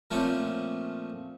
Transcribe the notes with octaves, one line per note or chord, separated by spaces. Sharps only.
A#2 F3 A3 A#3 C4 C#4